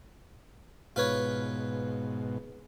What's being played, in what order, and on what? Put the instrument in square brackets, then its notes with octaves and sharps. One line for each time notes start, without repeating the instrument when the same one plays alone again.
[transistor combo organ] G#2 B2 [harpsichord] F4 B4 C#5